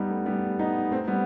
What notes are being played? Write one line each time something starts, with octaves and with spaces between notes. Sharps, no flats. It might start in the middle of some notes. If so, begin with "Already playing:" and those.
Already playing: G3 B3 D#4
A3
G3 B3
B3 D#4
A3 C4
G3 B3